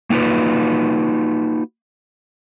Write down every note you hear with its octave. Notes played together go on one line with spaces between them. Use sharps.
A#3 D#4 F4 F#4 B4